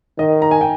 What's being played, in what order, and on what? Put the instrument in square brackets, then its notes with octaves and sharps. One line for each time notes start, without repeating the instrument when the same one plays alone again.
[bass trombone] D#3 [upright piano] D#5
[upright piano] A#5
G#5
G5